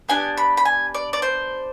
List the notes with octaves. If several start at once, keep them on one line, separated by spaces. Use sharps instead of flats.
B3 D4 G4 G#5
B5
B5
G#5
D5
D5
C5